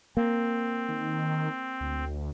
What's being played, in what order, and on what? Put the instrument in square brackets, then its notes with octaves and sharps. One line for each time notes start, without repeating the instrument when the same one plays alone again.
[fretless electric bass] A#3 [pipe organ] C4
[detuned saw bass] D#3
D2